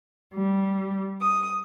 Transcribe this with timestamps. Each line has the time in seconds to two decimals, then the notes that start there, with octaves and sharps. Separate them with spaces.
0.34 G3
1.21 D#6